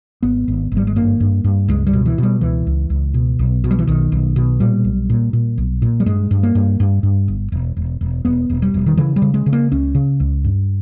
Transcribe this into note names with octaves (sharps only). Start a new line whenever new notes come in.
G#1 B3
G#1
G#1
G3
G#3
G2 A#3
G2
G2
C#2 G#3
G3
B2
E3
B2 G3
C#2 E3
C#2
C#2
B2
B1
B2
G3
E3
B1 D#3
B1
B2
A#2 G3
B1
A#2
A#2
B1
A#2
G3
G2 G#3
G2
A#3
G2
G2
G2
G1
E1
E1
E1
E1 B3
E1
G3
E1
D#3
C#3 E3
G3
C#3
G#3
C#3
A#3
C#2 C#4
C#3
C#2
G2